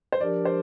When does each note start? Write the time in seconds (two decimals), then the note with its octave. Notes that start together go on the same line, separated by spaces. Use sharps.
0.12 C5
0.20 F3 D4 G4 A#4 D5
0.45 C5